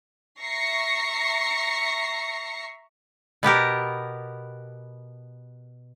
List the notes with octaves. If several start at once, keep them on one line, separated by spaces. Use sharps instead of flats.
E5 A#5 C#6 A#6 C7 C#7
B2 B3 G4 A#4